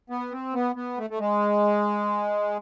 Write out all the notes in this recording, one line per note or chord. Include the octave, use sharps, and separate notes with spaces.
B3
C4
B3
B3
A3
A3
G#3